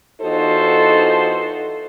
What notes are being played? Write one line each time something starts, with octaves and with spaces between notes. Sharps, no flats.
E2 D#4 F4 F#4 A4 C5